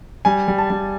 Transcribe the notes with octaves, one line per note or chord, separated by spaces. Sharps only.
G3 G#5
G3
A5
G3